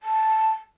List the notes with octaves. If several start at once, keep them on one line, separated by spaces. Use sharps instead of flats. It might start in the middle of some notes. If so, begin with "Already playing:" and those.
A5